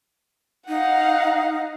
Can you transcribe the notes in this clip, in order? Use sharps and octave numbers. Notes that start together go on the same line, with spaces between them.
D#4 F5 F#5